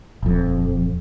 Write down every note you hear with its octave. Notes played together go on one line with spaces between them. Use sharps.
D#1 F2